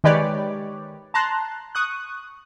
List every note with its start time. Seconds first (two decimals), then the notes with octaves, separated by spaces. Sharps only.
0.04 D#3 G#3 G4 B4 C#5 D5
1.14 A5 A#5 C6 F#6
1.75 C#6 D#6 F#6